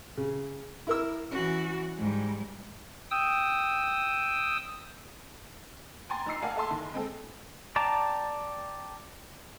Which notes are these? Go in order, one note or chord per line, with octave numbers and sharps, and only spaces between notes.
C#3
E4 A#4 E6
E3 C#4 F#4
G#2 G3
G5 D#6 E6
G5 G#5 A#5 C6 A6
A#1 D#4 A#5 E6 C7
A#4 D5 F5 F#5 G#5 A5
A4 E5 G#5 A5 C6 E6
F#1 D#3
G#3 C4 A4
D5 G5 A5 A#5 D6